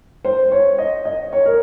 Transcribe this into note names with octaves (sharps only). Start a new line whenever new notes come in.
C5
C#5
D#5
D#5
C#5
A#4